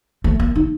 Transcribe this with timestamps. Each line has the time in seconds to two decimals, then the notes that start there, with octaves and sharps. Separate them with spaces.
0.24 A3
0.40 A#3
0.55 D#4